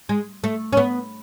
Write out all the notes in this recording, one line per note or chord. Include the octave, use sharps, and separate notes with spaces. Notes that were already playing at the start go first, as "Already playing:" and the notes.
G#3
A3
C#4
B3